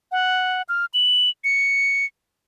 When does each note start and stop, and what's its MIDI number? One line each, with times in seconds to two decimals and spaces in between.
0.12 0.62 78
0.69 0.85 89
0.94 1.30 102
1.44 2.05 97